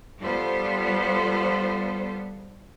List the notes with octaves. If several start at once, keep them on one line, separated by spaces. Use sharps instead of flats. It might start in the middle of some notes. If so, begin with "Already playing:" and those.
G3 B3 F4 A4 C5